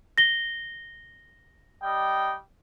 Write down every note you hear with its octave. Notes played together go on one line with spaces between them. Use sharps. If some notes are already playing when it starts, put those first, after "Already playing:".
A#6 G7
G3 D#5 G5